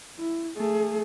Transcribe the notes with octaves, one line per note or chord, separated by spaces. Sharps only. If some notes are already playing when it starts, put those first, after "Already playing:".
E4
A3 G#4